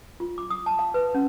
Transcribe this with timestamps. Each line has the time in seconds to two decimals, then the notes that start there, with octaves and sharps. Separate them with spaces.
0.20 F4
0.38 D6
0.50 D#6
0.66 A5
0.79 F5
0.94 B4
1.14 C#4